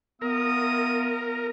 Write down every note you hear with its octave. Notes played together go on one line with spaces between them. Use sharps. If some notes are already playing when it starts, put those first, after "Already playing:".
B3 E4 F4 A#4 D#6